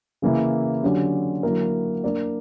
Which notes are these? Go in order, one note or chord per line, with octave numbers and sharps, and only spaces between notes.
C#3 E3 A#3 E4
D3 F#3 C#4 G4
D3 F#3 A#3 E4 A#4
A#3 D4 A#4 D5